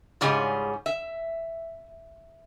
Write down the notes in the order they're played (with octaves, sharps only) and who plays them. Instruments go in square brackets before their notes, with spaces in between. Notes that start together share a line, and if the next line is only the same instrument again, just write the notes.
[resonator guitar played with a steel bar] G#2 C#3 G3 C#4 F4 G#4
E5